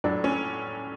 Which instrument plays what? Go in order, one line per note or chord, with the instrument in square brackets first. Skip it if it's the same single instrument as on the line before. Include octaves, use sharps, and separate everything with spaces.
[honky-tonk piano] A2 F#3 D4
C#4